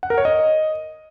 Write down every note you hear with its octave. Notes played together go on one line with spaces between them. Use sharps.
F#5
A#4
C#5
D#5